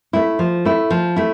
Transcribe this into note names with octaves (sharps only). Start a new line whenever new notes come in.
A3 E4
F3
A3 E4
F3
A3 E4